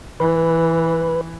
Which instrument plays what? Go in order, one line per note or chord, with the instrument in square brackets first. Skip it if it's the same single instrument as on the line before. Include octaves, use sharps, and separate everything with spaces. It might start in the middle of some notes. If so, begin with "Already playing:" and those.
[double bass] E3 [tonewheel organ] B4